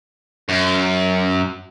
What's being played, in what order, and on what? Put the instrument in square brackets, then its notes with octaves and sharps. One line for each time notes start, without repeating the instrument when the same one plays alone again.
[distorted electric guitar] F#2